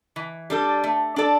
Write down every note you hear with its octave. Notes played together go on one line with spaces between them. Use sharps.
E3
G3 D4 A4
A3
D4 A4 D5